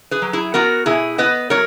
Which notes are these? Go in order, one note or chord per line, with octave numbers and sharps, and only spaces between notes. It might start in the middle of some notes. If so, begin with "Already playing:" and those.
G#4 B4
F#3
E4 G#4
B3 F#4 A#4
B2 E4 G#4
B3 B4 D#5
F#3 A#4 C#5